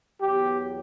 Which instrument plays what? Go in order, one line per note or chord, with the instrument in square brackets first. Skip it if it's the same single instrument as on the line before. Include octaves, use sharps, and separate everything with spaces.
[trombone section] E2 B2 F#3 G4